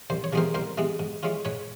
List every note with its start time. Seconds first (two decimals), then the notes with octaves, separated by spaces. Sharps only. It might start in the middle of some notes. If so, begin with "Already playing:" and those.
0.10 C2 C5
0.24 C#5
0.33 C3 E3 G#3 B3 A#4 C5
0.54 C2 A#4 C5
0.78 C3 E3 G#3 B3
0.99 G#2
1.23 E3 G#3 C#4 F4
1.45 G#2 B4 C#5